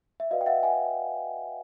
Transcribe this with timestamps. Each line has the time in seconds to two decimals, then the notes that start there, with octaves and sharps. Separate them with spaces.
0.20 E5
0.31 F#4 B4 D5 D#5 F5
0.41 G5
0.46 E5 F#5
0.63 F#5 G#5